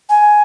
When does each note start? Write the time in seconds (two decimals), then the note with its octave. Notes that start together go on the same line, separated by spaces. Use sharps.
0.09 G#5